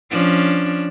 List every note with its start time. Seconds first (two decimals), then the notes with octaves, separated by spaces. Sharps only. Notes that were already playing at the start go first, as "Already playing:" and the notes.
0.11 F3 C#4 D4